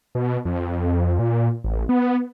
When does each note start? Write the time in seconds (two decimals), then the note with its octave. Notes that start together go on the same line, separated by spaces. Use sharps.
0.15 B2
0.45 F2
1.19 A#2
1.64 A1
1.89 B3